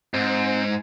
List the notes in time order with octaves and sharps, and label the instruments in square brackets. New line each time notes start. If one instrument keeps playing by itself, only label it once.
[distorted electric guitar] G#2 [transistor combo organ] C4